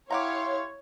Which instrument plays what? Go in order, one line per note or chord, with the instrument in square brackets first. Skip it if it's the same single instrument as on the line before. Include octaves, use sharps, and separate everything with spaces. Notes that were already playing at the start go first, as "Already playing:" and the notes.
[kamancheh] E4 F5 [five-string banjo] G4 F#5 A#5 [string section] C#5 [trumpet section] C6